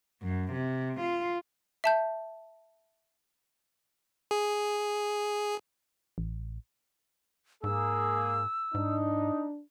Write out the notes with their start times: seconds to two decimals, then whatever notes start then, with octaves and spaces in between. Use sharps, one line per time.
0.22 F#2
0.52 C3
1.00 F4
1.84 E5 A5 G6
4.31 G#4
6.18 A1
7.64 G#2 A#3 G#4 E6
8.74 G#2 D4 D#4